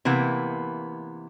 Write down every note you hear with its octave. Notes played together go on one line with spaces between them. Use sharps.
C3 E3 A#3 B3